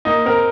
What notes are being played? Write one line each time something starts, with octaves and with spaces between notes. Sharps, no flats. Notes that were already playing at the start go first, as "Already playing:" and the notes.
A#3 D#4
C4 A#4